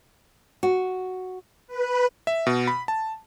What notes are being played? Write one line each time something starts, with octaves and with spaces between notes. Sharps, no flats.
F#4
B4
E5
B2
B5
A5